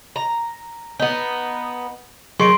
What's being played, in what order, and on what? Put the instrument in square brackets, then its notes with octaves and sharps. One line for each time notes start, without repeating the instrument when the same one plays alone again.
[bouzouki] A#5
B3 D#4
[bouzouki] D#3 [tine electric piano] F#3 G#4 C#6 [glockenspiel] C6 C7 D7